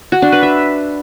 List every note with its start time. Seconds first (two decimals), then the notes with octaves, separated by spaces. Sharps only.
0.12 F#4
0.22 D4
0.32 B4
0.43 E5